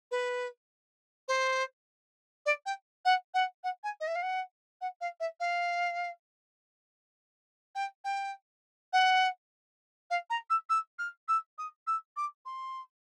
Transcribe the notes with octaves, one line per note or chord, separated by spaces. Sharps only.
B4
C5
D5
G5
F#5
F#5
F#5
G#5
D#5
E5
F5
F#5
F#5
F5
E5
F5
G5
G5
F#5
F5
A#5
E6
E6
F6
E6
D#6
E6
D6
C6